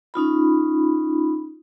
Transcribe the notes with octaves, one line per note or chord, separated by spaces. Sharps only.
C#4 D#4 F4 B5